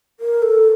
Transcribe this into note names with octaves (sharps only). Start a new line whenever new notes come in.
A#4
A4